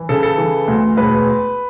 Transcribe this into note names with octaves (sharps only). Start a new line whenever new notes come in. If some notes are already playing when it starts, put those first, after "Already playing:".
Already playing: E3
C#3 A4
A4
E3
D2
E1 B4